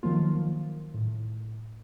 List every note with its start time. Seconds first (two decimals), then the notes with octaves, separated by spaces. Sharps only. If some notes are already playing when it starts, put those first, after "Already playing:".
0.03 D#3 F3 F#3 A#3 F4
0.94 A2